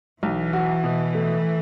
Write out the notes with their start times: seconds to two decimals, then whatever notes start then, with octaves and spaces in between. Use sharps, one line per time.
0.23 B1 E3
0.53 F#4
0.84 B2
1.14 A3